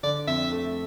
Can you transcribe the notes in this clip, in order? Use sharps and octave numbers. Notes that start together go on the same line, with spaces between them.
D3 D5
F2 E5
A3